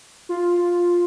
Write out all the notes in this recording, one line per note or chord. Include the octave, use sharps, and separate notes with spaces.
F4